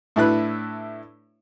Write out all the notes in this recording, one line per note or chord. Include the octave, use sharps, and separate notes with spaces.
A2 D4 E4 B4 F#6